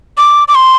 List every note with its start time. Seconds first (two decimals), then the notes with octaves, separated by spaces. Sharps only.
0.18 D6
0.48 D6
0.55 C6